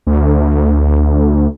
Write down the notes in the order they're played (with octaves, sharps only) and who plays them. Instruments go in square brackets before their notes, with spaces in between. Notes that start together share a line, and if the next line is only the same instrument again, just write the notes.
[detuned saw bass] D2